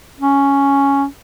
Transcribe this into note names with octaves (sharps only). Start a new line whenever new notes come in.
C#4